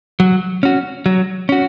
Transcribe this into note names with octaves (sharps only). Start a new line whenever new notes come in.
F#3
C#4 F#4
F#3
C#4 F#4